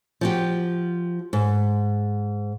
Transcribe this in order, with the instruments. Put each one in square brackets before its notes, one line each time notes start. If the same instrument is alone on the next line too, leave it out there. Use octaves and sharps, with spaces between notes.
[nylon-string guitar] F3 F#4 G4
G#2